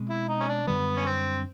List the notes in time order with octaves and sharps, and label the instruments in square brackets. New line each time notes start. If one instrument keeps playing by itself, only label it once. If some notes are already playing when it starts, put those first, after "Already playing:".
Already playing: [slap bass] B2 G#3 C4
[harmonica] E4
D#4
C#4
D4
[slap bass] F#2 D3 G3 [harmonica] B3
[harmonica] C#4
C4